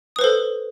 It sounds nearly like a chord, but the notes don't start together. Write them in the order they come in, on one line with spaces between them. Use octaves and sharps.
D#6 B4 C5 A4